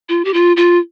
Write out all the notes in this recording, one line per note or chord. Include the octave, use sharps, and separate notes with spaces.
F4
G4
F4
F4